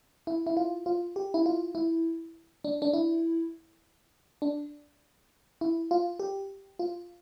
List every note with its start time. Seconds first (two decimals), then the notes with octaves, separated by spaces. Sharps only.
0.27 E4
0.47 E4
0.57 F4
0.86 F4
1.16 G4
1.34 E4
1.46 F4
1.75 E4
2.64 D4
2.82 D4
2.93 E4
4.42 D4
5.61 E4
5.91 F4
6.20 G4
6.79 F4